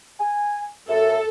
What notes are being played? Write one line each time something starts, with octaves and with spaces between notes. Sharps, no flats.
G#5
F#2 A4 E5